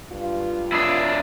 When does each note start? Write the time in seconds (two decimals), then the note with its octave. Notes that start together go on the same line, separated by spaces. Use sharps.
0.11 G2 F4
0.72 D4 E4 G#4